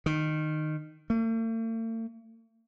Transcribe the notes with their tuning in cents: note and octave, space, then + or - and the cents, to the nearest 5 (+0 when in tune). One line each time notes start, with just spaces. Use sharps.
D#3 -15
A3 +45